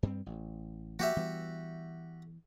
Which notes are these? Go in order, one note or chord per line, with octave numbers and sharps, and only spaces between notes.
G2 G3 C4
A1
F3 A#3 F#4 G4 E5
E3 G3 B3